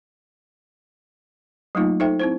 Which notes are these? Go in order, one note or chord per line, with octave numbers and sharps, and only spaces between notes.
F#3 A3 A#3 D#4 F4
D#4 A4 C5 E5 G5
C4 E4 C5